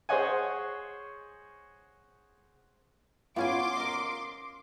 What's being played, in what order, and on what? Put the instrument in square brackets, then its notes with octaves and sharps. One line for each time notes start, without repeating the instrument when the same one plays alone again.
[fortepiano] G#4 C5 C#5 D#5 F#5 G#5
[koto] B3 C#4 G#5 [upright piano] F4 [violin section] C6 D6
[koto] A#4 D#5